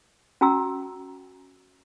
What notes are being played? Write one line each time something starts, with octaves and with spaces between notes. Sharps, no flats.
C#4 F#4 G#5 A#5 E6